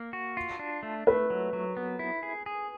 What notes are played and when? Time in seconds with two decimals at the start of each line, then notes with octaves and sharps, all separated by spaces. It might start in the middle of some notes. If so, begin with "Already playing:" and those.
Already playing: A#3
0.13 F#4
0.37 F4
0.59 D4
0.83 A3
1.07 A3 B4
1.30 F#3
1.53 F#3
1.77 B3
1.99 E4
2.23 G#4
2.46 G#4